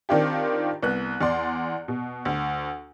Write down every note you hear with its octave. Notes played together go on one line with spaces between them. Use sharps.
D#3 C4 D4 F4 G4
C2 B3 F#6
E2 D5 C6
B2
D2